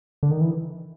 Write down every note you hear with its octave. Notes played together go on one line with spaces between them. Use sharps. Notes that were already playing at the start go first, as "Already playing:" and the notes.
D3
D#3
E3